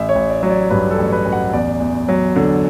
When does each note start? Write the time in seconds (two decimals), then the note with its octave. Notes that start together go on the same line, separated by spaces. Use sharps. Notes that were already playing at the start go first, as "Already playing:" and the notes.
Already playing: A1 E5
0.09 C#5
0.16 A1
0.30 D5
0.43 F#3
0.50 D5
0.70 G2 B4
0.91 A4
0.99 A1
1.12 B4
1.25 A1
1.32 F#5
1.53 E2 D5
1.80 E2
2.09 F#3
2.36 D3